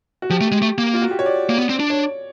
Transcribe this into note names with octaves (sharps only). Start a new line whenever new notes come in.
F#4
F3 G4
A3
G#3
A3
A#3
F4
F#4
G4
C#5
D5
A#3
B3
C4
D4
C#5